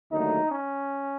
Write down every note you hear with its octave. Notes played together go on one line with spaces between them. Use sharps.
D#2 D3 F#3 A3 D#4
C#4